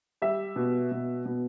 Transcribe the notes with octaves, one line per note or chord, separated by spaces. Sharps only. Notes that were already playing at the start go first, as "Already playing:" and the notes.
G3 E5
B2
B2
B2